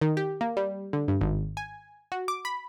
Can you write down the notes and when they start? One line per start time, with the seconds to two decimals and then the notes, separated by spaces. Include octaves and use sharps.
0.01 D#3
0.17 G4
0.41 A#3
0.57 G3
0.93 D3
1.08 G2
1.21 G#1
1.57 G#5
2.12 F#4
2.28 D6
2.45 B5